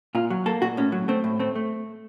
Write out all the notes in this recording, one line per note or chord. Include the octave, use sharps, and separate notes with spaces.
A#2 F4
F#3
A#3 A4
A#2 F#4
A2 C#4
F#3
A3 C4
A2
A3 C4
A3